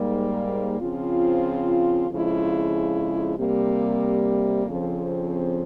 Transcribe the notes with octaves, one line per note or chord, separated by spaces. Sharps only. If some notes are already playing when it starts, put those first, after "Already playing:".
Already playing: G#2 G3 A#3
C#3 F3 C4 F4
F2 C#3 F3 G#3 E4
C3 G3 A#3
F2 C#3 F3 C4